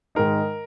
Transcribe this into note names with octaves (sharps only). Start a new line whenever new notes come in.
G#2 D#3 G#3 D#4 A#4